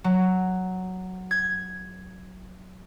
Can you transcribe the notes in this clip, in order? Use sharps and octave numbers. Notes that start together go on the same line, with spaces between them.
F#3
G#6